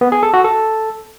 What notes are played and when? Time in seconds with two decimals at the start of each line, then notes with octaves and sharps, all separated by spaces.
0.01 B3
0.12 G#4
0.23 A4
0.34 F#4
0.44 A4